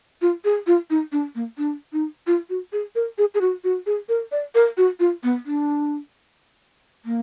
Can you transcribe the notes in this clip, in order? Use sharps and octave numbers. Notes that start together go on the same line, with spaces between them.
F4
G#4
F4
D#4
D4
A#3
D4
D#4
F4
F#4
G#4
A#4
G#4
G#4
F#4
F#4
G#4
A#4
D5
A#4
F#4
F4
B3
D4
A#3